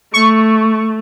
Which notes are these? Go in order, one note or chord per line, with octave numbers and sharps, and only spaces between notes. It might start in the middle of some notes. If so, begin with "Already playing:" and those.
A3 C#6